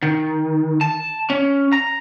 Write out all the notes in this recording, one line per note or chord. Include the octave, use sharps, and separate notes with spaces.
D#3
A5
C#4
A#5